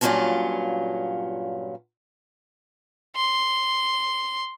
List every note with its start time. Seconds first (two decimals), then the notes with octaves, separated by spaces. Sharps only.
0.01 G2 A#2 F#3 C#4 F4 A5
3.16 C6